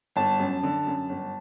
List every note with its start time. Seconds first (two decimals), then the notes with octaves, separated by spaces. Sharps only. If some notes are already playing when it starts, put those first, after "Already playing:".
0.16 G1 A5
0.40 F#2
0.63 D3
0.87 F#2
1.09 G1